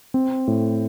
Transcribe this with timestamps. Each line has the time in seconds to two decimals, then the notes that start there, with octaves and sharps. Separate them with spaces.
0.14 C4
0.47 A2